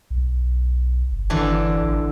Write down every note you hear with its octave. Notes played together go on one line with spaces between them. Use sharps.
B1
G1
G1 D3 E3 D4
A1